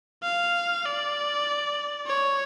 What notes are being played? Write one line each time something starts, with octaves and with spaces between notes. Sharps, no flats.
F5
D5
C#5